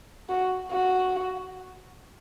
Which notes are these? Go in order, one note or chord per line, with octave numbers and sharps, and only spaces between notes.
F#4
F#4